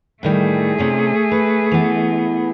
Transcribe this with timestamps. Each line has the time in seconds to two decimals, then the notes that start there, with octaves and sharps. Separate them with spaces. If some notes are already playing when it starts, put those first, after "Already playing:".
0.23 A2 D#3 G3 A3 G#4
0.78 C3 C#4 D4
1.31 B4
1.71 E3 B3